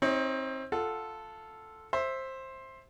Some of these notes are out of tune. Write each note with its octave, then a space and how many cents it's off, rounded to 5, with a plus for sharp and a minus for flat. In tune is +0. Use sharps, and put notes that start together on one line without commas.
C4 +25 D#4 +35 C#5 +0
F4 +0 A4 +0 F#5 +0
C5 +15 E5 +0